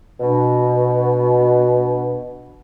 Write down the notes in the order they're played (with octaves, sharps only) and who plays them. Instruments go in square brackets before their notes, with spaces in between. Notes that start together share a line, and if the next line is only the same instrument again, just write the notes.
[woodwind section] B2 D4